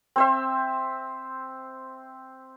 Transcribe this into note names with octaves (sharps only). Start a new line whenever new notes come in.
C4 C5 E5